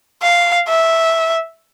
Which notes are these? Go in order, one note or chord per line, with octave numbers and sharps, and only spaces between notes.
F5
E5